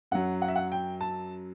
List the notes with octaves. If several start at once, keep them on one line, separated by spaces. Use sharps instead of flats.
F#2 F#3 F#5
F#5
E5
F#5
G5
A5